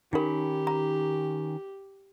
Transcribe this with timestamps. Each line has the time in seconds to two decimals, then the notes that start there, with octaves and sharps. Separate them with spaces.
0.13 D#3 C#4 D#4 G4 A#4 B5
0.67 A#5